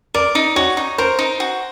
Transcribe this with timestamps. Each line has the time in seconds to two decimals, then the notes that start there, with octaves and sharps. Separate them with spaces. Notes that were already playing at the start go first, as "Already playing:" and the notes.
0.14 A#4 D5
0.35 D#4
0.56 F#4 C#5
0.77 D#4
0.98 A#4 C5
1.19 D#4
1.40 F#4